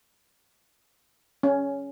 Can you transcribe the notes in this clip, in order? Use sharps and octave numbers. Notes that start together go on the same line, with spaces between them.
C#4